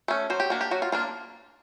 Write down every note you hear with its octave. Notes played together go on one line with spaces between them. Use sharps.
A3 C#4
F#3 C5
G4
A#3 D4 F#4
G4
F#3 F#4
F4
A#3 D4 F4